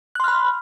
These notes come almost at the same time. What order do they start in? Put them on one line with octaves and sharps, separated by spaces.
F#6 C6 F6 B5